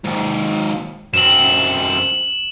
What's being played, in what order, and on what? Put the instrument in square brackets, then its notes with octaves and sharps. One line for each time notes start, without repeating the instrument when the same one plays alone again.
[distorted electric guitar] D#2 G#2
[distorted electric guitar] F#2 C4 [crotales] E7 F#7